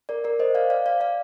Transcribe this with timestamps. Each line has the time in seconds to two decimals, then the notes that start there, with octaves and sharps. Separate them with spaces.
0.09 A#4 D5
0.24 A#4 D5
0.39 C5 D#5
0.55 D5 F5
0.70 D5 F5
0.86 D5 F5
1.00 D5 F5